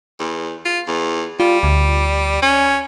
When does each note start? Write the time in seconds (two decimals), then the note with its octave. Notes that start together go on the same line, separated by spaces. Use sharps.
0.20 E2
0.65 F4
0.87 E2
1.40 G3 F4
1.63 D2
2.42 C#4